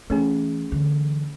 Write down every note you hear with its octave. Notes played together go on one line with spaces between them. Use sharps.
E3 A3 C#4 G#4
D3 E3